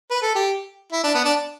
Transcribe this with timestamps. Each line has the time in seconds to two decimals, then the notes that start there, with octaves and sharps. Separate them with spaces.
0.11 B4
0.23 A4
0.35 G4
0.92 E4
1.04 D4
1.15 B3
1.25 D4